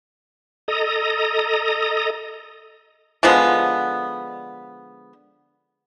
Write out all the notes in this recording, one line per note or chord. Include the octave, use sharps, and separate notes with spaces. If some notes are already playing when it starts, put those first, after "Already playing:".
A4 D#5 A#5 D#6
D3 F3 G#3 B3